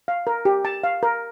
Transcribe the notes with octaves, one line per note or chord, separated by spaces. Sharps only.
F5
A#4
G4
A5
F5
A#4